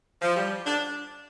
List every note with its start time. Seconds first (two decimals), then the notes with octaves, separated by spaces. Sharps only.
0.22 F3
0.36 G3
0.66 D4